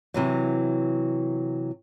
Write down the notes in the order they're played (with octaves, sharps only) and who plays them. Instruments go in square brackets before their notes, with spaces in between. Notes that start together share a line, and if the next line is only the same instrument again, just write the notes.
[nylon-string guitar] C3 E3 F#3